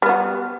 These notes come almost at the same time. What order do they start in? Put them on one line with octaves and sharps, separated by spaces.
G3 B3 F#4